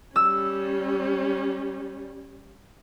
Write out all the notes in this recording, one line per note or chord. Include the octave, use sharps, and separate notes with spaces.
G3 C#4 E6